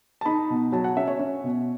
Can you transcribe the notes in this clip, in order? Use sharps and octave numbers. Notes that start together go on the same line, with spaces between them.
A5
D#4 B5
B2
F#3 A5
F#5
C#4 E5
C#5
C#4
B2